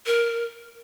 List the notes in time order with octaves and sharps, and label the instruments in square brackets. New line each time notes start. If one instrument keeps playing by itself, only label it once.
[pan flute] A#4